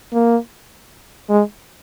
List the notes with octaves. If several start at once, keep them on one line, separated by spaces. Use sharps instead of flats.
A#3
G#3